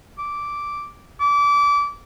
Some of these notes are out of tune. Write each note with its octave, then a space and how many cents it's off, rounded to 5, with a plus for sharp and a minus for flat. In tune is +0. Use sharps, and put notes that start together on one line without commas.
D6 -5
D6 -25